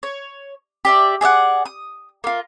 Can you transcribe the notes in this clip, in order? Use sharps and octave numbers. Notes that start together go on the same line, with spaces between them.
C#5
G4 D5 E5
G#4 D5 E5 F#5
D#6
A#3 F4